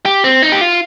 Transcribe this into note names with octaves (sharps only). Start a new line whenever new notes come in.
G4
C4
D#4
G4
F4